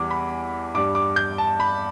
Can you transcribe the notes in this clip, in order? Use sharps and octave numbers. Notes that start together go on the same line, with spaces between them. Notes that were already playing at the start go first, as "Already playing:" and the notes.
Already playing: E2 E3 G3 D6
B5
G2 G3 D6
D6
G6
A5
B5